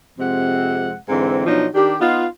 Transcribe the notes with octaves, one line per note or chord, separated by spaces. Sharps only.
F2 C3 G#3 C4 F#5
G#2 D3 E3 C4
B2 F3 F#3 D4 D#4
D#3 D4 G4
B3 D#4 F4